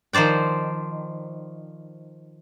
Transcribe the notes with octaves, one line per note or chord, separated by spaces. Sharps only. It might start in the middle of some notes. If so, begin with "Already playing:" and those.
D#3 F3 C5 D5 G5